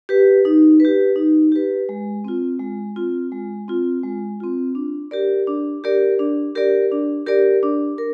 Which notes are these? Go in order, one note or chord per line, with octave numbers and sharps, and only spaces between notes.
G4 B4
D#4
G4 B4
D#4
G4 B4
G#3
C4 F4
G#3
C4 F4
G#3
C4 F4
G#3
C4 F4
D4
G4 A#4 D5
D4
G4 A#4 D5
D4
G4 A#4 D5
D4
G4 A#4 D5
D4
A#4